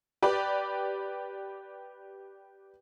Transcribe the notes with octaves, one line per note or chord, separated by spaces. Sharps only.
G4 B4 D5